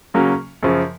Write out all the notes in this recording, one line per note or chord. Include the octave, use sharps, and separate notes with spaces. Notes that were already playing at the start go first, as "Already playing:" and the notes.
C#3 F#3 A#3 C#4
F#2 C#3 F3